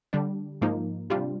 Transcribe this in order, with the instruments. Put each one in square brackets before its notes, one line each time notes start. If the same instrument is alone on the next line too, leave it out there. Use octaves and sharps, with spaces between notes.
[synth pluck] D3 G3 D4
G#2 F3 A#3 D#4
C3 G3 D4 F4